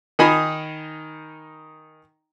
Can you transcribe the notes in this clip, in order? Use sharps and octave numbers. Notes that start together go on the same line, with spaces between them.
D#3 D#4 G#5 B5 D#6